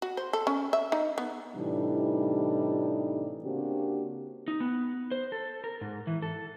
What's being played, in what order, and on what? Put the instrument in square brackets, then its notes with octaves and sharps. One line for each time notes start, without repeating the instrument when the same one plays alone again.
[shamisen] F#4
C5
A4
C#4
E5
D#4
B3
[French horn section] A2 C3 E3 G3 D4 D#4
C#3 A#3 C4 D4 F#4 G4
[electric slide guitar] D#4
B3
C5
A4
A#4
G#2
E3
A4